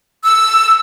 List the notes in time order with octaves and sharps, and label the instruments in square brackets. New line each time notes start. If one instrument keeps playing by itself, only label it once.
[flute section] E6